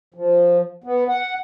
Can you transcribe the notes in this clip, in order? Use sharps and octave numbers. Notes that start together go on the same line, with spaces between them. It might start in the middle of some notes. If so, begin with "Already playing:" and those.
F3
B3
F#5